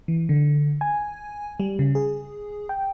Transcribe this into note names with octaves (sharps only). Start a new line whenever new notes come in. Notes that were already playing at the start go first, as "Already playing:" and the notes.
E3
D3
G#5
G3
C#3
G#4
G5